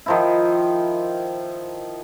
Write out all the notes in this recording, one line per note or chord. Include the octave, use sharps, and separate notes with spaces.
D#3 F3 E4